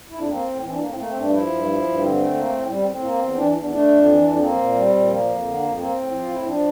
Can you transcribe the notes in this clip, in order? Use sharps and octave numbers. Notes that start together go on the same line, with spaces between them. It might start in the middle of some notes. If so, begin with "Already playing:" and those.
F2 E4
D4
A#3 C4
A2
E3 C4
D4
A2 A#3
C4
A3 A#3
C4
G2
D4
F3 E4
G2
F3
G2
D3 C4
A3
A#3
A2
G3 C4
C4
A2
C4
A#3
E2
E3 D4
E2
D4
A3 D4
F2
E3
F2
D4
A#3 C4
A#2
G3
A#2
F3 A#3
F2
D3
F2
A#3 C4
A2
F3
F4
A2 E4
F3 D4